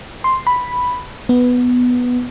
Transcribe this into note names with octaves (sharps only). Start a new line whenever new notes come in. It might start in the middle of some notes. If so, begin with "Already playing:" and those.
C6
B5
B3